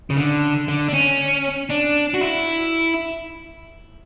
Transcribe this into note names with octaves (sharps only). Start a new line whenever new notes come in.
C#3
D3
D3
D4
C#4
D4
F#4
E4